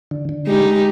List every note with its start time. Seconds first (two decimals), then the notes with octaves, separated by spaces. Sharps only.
0.11 D3
0.29 D3
0.47 G#3 D#4 G4
0.65 G#3